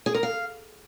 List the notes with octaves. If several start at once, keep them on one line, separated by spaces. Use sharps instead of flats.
G#4
A#4
F5